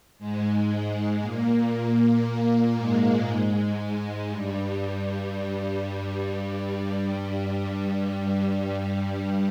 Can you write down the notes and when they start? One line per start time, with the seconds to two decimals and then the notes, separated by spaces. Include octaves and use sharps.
0.19 G#2 G#3
0.70 G#2 G#3
1.21 A#2 A#3
2.76 G#2 G#3
3.27 G#2 G#3
3.79 G#2 G#3
4.30 G2 G3
4.81 G2 G3
5.33 G2 G3